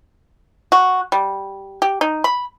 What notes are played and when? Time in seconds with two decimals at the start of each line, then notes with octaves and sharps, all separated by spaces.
0.72 F#4
1.12 G3
1.82 G4
2.01 D#4
2.24 B5